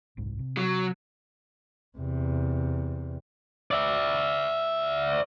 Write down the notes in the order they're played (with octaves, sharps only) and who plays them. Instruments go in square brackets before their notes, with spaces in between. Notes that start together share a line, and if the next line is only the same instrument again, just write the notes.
[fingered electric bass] F#1 C2 G#2
C3
[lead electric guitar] F#3
[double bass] E2 C3
[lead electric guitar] D5 E5